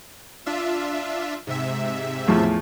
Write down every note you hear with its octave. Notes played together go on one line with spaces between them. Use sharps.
D4 F4 E5
G#2 C3 E5
E2 A2 F3